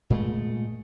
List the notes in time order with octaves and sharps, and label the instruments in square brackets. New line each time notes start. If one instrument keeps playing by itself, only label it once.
[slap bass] A#2 G#3 A3